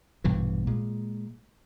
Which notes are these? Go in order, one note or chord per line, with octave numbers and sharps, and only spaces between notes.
A#1 G2 B2 E3
A#2 G#3